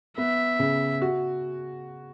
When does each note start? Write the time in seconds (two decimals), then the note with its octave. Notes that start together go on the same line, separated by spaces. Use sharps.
0.18 B3 E5
0.59 C#3
1.02 F#4